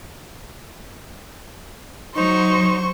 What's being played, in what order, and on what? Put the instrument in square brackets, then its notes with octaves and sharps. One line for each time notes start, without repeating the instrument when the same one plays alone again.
[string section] F#3 [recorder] D#4 [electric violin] C5 C#6